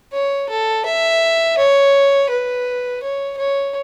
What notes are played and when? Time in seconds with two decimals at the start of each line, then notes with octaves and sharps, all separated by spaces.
0.13 C#5
0.49 A4
0.85 E5
1.58 C#5
2.30 B4
3.03 C#5
3.38 C#5